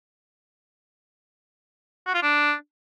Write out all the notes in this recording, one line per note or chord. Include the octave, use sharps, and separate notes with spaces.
F#4
F4
D4